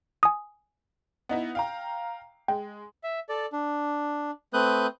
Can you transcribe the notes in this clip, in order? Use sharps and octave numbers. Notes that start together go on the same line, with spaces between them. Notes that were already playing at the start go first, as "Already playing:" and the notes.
G#5 D#6
B3 D#4 E4
F5 G5 A#5
G#3 G5
E5
A4 D5
D4
A3 C4 B4 D#6 F#6 G6